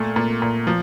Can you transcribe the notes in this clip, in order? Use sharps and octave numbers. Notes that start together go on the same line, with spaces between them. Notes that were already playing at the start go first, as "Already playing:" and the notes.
Already playing: A#2 A3
A#2
A#2
F3